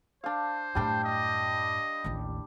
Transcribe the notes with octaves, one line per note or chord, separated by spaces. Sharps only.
D4 C5 F5
F#2 A2 G3 D4 G5
D#5
A1 D#2